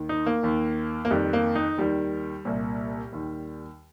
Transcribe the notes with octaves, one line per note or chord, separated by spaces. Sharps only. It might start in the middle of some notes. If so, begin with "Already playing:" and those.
Already playing: D#2 D#3
D#4
A#3
D#2 D#3
A#3
F2 D#3 G3
A#3
D#4
D#2 D#3 G3
C2 A#2
D#2 D#3